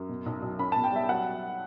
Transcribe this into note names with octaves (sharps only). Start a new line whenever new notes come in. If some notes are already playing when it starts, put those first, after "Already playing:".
Already playing: F#2
B2
B1
B1
C#4 B5
B2 A5
G5
G3 E5
F#3 F#5